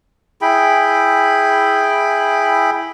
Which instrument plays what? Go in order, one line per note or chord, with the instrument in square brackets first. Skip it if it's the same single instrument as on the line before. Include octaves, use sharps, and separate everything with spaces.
[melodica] E4 G#4 G5 B5